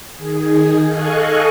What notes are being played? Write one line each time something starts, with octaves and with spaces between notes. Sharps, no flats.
D#3 G#4
A4 D#5 F5 G#5 C#6 F#6